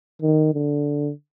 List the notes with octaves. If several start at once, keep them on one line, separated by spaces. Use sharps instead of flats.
D#3
D3